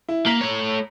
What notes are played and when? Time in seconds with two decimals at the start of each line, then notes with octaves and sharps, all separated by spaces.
0.09 E4
0.26 A#3 A#5 B6
0.41 A3 C#5